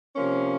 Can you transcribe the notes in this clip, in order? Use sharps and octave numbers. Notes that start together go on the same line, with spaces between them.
C3 F3 A#3 C#4